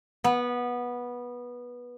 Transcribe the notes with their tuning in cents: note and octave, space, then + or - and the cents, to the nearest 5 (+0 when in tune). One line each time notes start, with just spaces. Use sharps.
B3 -15